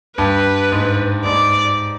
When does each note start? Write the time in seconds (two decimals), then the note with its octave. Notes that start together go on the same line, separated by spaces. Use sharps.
0.18 G2 B4
0.72 G#2
1.25 G#2 D5